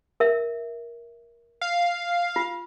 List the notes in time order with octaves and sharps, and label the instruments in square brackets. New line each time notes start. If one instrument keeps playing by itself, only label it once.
[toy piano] A#4 E5
[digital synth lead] F5
[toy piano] F4